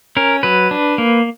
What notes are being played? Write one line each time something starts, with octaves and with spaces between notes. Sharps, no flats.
C#4 A#4
F#3 B4
D4
A#3